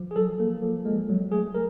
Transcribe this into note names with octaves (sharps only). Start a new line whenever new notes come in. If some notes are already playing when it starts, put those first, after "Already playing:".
Already playing: F3
G#4
F#3 A4
A#3
F3
G#3
F#3
A3 G#4
A#4